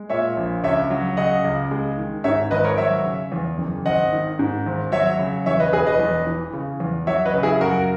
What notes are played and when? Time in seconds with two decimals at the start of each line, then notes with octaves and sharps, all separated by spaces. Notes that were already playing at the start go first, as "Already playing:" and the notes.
Already playing: G#3
0.10 A#2 C#5 E5
0.37 A#1
0.63 C#2 C#5 E5
0.90 F#3
1.17 C#3 D#5 F#5
1.44 C#2
1.71 G#3
1.98 D#3
2.24 G#2 C#5 E5
2.51 G#1 B4 D#5
2.64 A#4 C#5
2.78 F#3 C#5 E5
3.05 C#3
3.32 E2
3.58 F#1
3.85 G#1 D#5 F#5
4.13 D#3
4.39 G#2
4.66 G#1
4.92 F#3 C#5 E5
5.19 C#3
5.46 E2 C#5 E5
5.60 B4 D#5
5.73 E1 G#4 B4
5.86 B4 D#5
6.00 E2
6.26 E3
6.53 C#3
6.80 E2
7.07 F#3 C#5 E5
7.25 B4 D#5
7.34 C#3
7.43 E4 G#4
7.61 F#2 F#4 A#4